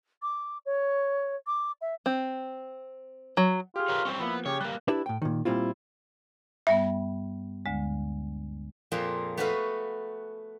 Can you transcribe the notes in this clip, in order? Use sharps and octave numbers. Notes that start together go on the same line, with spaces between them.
D6
C#5
D6
E5
C4
F#3
F4 G4 G#4
A#4 B4 C#5
G3 C4 C#4 C5 C#6
F3 A#3 B3 E4
C#3 G4 C#5
G3 A#3 F#6
D4 E4 G4 B4 D5 E5
A2 G5
A#2 D#3
A#2 G3 C4 E4 F4
G2 G3 B3 E5
D2 D3 G#3
F2 A#2 A#3 F4 G#4
A3 B3 F#4 A4 B4 F5